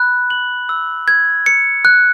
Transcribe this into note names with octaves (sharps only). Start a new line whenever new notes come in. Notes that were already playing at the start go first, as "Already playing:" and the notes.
Already playing: B5 F#6
F#7
E6
G#6
C#7
F#6